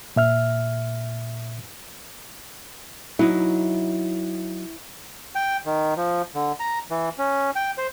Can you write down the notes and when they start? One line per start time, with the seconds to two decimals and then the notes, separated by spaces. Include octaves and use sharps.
0.16 A#2 E5 F6
3.19 F#3 D#4 E4
5.35 G5
5.65 D#3
5.97 F3
6.35 D3
6.60 A#5
6.91 E3
7.18 C#4
7.55 G5
7.78 C5